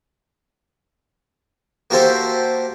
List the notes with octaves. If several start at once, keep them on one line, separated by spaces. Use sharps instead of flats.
A#3 F#4 G4 A4 C5 E5